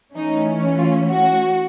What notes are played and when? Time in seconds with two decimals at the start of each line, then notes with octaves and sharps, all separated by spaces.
0.15 E3 A3 C#4 D#4
0.78 F4
1.09 F#4